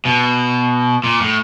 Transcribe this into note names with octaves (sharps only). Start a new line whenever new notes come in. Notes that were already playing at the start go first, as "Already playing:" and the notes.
B2
A#2
A2